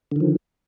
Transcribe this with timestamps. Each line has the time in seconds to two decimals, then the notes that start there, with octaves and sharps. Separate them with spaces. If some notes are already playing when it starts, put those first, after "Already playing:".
0.11 D3
0.16 D#3
0.20 F3